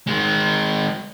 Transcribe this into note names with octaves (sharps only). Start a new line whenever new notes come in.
D#3 G#3